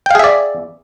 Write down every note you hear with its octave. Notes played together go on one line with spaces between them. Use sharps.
G#4 D5 E5 F5 G5